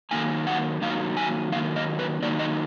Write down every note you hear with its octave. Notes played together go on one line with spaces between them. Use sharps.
D#3 F#3 A#3 D#4 G#5
F#5
D#3 F#3 A#3 D#4 F5
G#5
D#3 F#3 A#3 D#4 F5
D#5
B4
D#3 F#3 A#3 D#4 D5
D#5